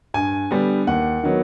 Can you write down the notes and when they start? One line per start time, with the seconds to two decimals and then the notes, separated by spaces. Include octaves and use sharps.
0.14 G2 G#5
0.51 D3 G3 B3
0.87 D#2 F#5
1.23 D#3 F#3 B3